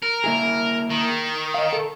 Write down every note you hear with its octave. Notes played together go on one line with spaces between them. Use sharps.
A#4
A#3 E4 G#4
D#3
D#5 F5
A4